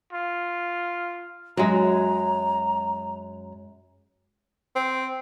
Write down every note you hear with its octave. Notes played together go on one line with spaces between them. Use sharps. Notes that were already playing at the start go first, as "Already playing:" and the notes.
F4
F#2 F#3 G#3 A#5
C4